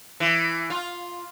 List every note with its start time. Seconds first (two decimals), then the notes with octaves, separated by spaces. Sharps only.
0.20 E3
0.70 F4